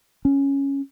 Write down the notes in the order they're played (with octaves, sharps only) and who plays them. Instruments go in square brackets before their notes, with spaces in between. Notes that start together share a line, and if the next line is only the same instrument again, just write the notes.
[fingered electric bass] C#4